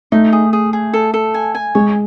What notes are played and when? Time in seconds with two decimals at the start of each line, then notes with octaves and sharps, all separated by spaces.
0.12 A3 D#4
0.33 G#4
0.53 G#4
0.73 G#4
0.94 A4
1.14 A4
1.34 G#5
1.55 G#5
1.75 G#3 C#5